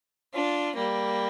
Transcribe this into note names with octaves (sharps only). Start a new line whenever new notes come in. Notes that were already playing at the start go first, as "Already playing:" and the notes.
D4 F4
G3 A#3